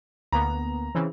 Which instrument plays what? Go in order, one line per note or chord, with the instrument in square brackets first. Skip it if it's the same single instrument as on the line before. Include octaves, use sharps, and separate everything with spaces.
[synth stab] D2 A#3 B3 [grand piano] A#5
[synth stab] C#3 E3 C4